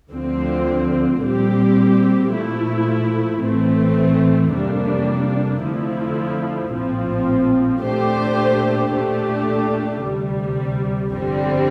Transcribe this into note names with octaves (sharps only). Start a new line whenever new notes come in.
D2 D3 F3 C4
A#2 G3 C4 G4
A#2 F3 A3 E4
A1 A2 E3 A3 C4
F2 C3 G3 A#3 D4
F2 D3 F3 A3 E4
A#1 A2 F3 C4
A#2 A3 D4 G4 C5
A#2 A3 D4 G4
D2 C3 G3
G1 F2 D3 G3 C4